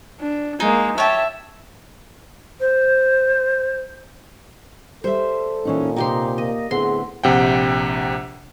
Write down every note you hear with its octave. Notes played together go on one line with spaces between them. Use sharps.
D4
G#3 A#3 D#4
G4 C#5 E5 A5
C5
G3 A4 C5 E5
A#2 E3 C#4 D#4
C3 D#4 G4 G5 C6
A#3 D#5
A2 D3 B3 C4 G#4 C6
A#1 C3 F#5 G5